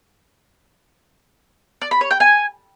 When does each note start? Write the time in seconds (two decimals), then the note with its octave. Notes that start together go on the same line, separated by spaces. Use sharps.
1.82 D5
1.91 B5
2.01 C#5
2.11 G5
2.20 G#5